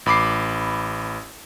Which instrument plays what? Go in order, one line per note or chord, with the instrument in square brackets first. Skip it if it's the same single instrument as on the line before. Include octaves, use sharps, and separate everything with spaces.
[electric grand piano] A1 B5 D6 C7